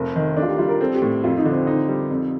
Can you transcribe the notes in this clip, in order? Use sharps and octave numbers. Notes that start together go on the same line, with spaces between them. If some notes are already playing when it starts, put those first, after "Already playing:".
Already playing: F1 A#4
D#3
D4 A4
F4
G4
G3 F4
A#4
C4 A4
G4
A2
F2 F4
D#4
D3
C4
D#4
G3
F2